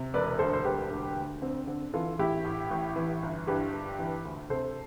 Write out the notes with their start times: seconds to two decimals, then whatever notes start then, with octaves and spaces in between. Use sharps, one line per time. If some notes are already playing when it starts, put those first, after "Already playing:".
Already playing: C3
0.14 E1 B4 D5
0.39 D2 A4 C5
0.53 C5
0.65 E1 G4 B4
0.91 D2
1.16 D2
1.42 D3 C4
1.67 D3 C4
1.94 E3 F4 A4
2.19 A1 E4 G4
2.45 A2
2.71 A1
2.96 E3
3.23 G1
3.47 G2 G4 B4
3.73 G1
3.99 E3
4.25 D2
4.50 C3 A4 C5